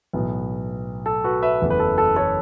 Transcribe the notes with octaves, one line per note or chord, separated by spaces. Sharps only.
B1 A2 E3 B3
A4
F#4 B4
B4 E5
F#1 E2 E3 A3
B4
A4
A4
A4 C#5